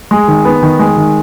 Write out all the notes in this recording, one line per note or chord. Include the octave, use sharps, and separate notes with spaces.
G#3
D#3
B3
D#3
G#3
D#3